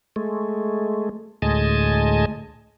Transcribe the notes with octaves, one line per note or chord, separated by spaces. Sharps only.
G#3 A3
D2 A2 G#3 D#5 G#5 A5